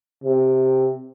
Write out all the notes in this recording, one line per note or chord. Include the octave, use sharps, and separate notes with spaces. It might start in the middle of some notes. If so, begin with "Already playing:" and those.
C3